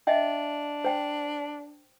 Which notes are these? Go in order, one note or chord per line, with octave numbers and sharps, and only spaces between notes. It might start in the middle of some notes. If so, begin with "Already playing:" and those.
D4 D#5 E5 G5
C5 G5